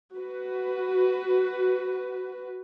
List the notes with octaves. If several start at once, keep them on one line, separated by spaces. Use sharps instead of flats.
F#4 B4